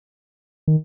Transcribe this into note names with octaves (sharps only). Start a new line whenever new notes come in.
D#3